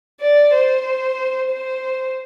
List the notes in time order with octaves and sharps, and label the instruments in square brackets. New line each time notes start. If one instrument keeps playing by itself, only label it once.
[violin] D5
C5
C5